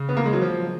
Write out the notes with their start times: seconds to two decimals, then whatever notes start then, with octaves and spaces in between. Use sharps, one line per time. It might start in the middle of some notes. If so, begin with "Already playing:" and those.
Already playing: C#3
0.09 B3
0.17 A#3
0.26 G#3
0.33 F#3
0.42 F3